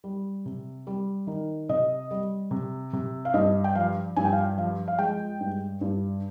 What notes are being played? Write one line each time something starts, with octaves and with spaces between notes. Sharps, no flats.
G3
C3
G3
D#3
C3 D#5
G3
C3
C3
F5
G2 D#5
G5
F3 F5
G2 G#5
G5
F5
G5
F3 F5
F5
G#3 G5
G2
G2